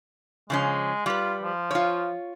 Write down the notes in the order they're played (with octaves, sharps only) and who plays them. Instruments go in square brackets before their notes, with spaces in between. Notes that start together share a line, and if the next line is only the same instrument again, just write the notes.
[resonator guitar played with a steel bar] C#3 F3 C#4 [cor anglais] G#3
[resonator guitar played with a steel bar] G3 B4 [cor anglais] F4
[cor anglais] F3
[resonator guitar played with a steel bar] F4 C#5